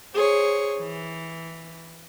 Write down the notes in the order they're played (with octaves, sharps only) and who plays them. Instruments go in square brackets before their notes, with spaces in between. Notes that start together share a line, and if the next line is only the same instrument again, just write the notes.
[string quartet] G#4 C5 C#5
E3